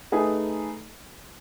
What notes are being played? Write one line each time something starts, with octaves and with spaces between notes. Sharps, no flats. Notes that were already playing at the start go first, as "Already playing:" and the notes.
A3 D#4 G#4 B4